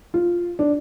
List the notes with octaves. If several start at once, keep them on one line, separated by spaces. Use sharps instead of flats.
F4
D4